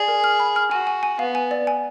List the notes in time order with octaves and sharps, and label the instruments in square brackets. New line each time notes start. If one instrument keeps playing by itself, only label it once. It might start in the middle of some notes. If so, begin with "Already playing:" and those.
Already playing: [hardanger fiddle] G#4 [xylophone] D5
[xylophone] A#4
F6
B5
F6
[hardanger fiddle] F#4 [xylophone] G#5
[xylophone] G#5
G#5
[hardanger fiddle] B3 [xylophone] F5
[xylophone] G#5
D5
G#5